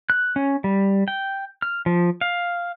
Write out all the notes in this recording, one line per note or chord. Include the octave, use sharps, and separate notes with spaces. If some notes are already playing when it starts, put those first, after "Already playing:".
F#6
C#4
G3
G5
F6
F3
F5